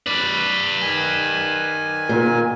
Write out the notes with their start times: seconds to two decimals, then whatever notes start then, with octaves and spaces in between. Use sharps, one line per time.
0.06 B4 D5
0.82 D#3 G#5
2.09 A#2